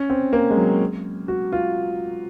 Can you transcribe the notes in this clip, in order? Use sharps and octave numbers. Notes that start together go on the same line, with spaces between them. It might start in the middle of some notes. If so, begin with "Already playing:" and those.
Already playing: C#4
C4
A#3
G#3
F#3
F#4
F4